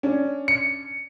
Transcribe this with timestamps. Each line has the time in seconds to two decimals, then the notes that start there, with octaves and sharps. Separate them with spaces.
0.03 C#4 D4
0.48 C#7